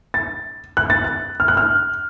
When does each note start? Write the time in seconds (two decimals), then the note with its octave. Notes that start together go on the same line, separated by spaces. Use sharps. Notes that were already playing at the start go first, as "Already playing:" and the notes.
0.14 A6
0.77 F#6
0.90 A6
1.04 F#6
1.40 F6
1.48 F#6
1.57 F6